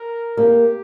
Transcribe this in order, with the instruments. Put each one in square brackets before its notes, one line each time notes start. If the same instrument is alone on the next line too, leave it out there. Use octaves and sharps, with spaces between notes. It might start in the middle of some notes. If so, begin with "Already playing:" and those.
Already playing: [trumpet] A#4
[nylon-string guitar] A#3 [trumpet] G4